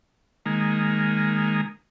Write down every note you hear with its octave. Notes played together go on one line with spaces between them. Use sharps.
D#3 G#3 A#3